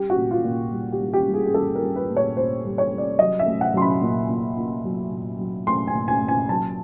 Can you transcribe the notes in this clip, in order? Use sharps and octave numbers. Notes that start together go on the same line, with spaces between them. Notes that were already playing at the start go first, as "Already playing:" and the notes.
Already playing: G3 G4
F#4
A#2
F4
A#2
G3
G4
G3
G4
G3
G#4
G#4
G3 A4
A#4
G3
B4
A#2
C#5
A#2 C5
G3
C#5
G3
D5
F#3 D#5
E5
A3
F#5
F#3 C6
B5
A#2
A#2
A#2
F#3
A#2
F#3
A3 C6
G#5
A#2
G#5
A#2
G#5
F#3 A5